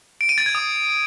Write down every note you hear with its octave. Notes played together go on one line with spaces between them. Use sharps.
D7
D#7
A6
G#6
D#6